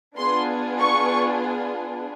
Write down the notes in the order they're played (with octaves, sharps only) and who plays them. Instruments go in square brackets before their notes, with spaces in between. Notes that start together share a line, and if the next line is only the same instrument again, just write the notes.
[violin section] B3 D4 F4 G#4 C6
C#6